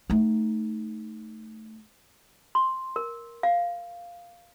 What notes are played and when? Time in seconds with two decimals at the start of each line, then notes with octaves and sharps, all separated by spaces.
0.10 A3 D#4
2.55 C6
2.96 A#4
3.43 F5